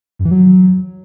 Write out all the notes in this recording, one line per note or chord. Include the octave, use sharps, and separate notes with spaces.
F#2
E3
F#3